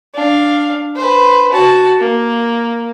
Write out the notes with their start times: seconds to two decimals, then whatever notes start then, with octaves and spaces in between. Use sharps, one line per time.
0.14 D4 F5
0.96 B4 C5
1.52 F#4 A5
2.00 A#3